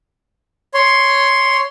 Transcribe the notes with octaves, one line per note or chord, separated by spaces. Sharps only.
C#5 C6